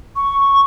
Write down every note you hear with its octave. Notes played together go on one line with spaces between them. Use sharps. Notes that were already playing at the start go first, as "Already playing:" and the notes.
C#6